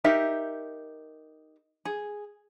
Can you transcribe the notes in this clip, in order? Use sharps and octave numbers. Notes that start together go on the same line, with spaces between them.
D#4 G4 A#4 E5
G#4